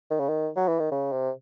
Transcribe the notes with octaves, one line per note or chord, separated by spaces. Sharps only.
D#3
C#3
D#3
F#3
E3
D#3
C#3
C3